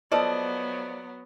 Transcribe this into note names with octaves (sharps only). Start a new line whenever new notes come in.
F3 F#3 B3 A4 D5 D#5